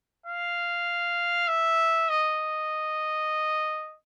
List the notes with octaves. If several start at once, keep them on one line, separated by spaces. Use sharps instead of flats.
F5
E5
D#5